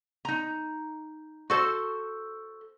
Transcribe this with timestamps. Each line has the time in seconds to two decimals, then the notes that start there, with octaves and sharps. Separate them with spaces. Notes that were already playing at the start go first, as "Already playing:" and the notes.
0.25 D#4 A#5
1.50 F#4 A4 C5